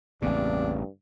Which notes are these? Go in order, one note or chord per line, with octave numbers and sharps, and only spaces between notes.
A1 E2 G2 C#3 A#3 C4 D4